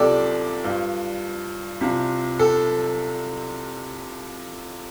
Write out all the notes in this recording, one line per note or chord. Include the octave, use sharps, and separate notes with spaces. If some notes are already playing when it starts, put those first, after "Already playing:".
Already playing: C2 C3 F3 G4 A4 D5
G2 F3
C2 C3 F3
A4